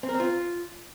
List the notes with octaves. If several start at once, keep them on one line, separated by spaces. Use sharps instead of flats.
C4
A#4
C4
F4